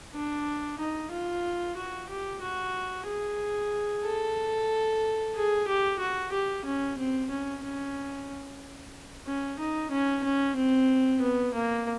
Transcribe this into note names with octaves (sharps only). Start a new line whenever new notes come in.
D4
D#4
F4
F#4
G4
F#4
G#4
A4
G#4
G4
F#4
G4
C#4
C4
C#4
C#4
C#4
D#4
C#4
C#4
C4
B3
A#3